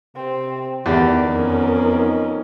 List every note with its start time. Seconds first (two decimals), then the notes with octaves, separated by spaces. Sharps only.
0.16 C3 C4
0.86 E2 D#3 G4 D5
1.29 F2 B3 C#4 A#4
1.83 D#4